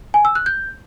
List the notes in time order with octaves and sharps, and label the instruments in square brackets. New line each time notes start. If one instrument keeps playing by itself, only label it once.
[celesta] G#5
E6
F#6
G6